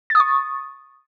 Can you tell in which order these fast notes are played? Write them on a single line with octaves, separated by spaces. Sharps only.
A6 D#6 C#6